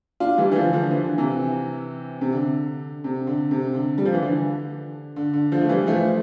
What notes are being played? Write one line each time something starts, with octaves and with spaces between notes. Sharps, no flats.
D4 F4
E3 G3
E3
D3 F3
D3 F3
E3
D3
C3 E3
C3
D3
C3
D3
C3
D3
G3
F3
E3
D3
D3
D3
D3 F3
A3
E3 G3
F3 A3